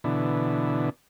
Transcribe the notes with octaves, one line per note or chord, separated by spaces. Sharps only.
B2 D3 E3